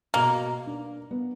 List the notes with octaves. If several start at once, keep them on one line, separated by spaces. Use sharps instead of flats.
B2 A#3 A#5
D4
B3